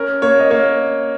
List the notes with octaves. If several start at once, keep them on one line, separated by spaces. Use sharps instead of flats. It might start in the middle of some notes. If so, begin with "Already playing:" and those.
Already playing: C#4 A#4
A#3 C#5
D#5
A#3 C#5